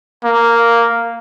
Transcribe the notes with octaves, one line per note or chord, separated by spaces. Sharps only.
A#3